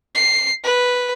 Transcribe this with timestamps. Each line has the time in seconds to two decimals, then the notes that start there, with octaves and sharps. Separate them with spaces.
0.15 C7
0.64 B4